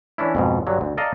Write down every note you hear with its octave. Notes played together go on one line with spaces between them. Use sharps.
E3 C#4 D4 E4
F2 G#2 B2
G2 D3 F#3
D2
A4 D5 D#5 F5 A#5